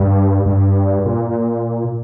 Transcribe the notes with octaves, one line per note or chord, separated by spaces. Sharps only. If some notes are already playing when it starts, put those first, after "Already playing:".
Already playing: G2
G2
A#2